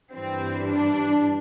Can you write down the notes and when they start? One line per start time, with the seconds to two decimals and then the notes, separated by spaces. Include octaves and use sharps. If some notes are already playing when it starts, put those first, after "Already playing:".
0.13 G2 E3 G3 C4
0.66 D4